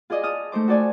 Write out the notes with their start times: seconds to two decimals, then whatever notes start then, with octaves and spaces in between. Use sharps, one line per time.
0.10 F4 G#4 D5 D#5
0.24 A5 D#6 F6
0.52 A3 D#4 C5 D6
0.68 F#4 A4 D5 G#5